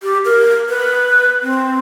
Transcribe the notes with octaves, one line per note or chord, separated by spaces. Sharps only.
G4
A#4
B4
C4